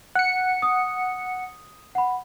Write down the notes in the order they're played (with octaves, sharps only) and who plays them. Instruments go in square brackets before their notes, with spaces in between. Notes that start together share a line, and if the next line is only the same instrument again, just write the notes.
[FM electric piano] F#5 C#7 [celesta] F#6
[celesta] D#6
F#5 B5